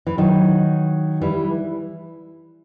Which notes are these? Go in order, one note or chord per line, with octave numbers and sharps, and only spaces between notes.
E3
D#3 F#3
E3 G3